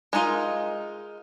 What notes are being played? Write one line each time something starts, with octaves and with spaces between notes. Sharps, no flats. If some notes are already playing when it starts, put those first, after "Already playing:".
G#3 D4 D#4 F4 A#4